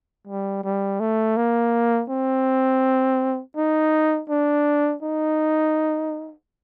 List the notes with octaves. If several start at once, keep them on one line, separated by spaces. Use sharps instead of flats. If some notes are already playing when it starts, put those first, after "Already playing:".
G3
G3
A3
A#3
C4
D#4
D4
D#4